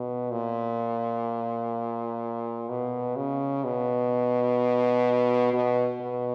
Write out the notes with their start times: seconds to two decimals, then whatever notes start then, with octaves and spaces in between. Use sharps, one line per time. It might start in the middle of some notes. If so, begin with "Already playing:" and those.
Already playing: B2
0.31 A#2
2.69 B2
3.16 C#3
3.64 B2
5.53 B2
6.00 B2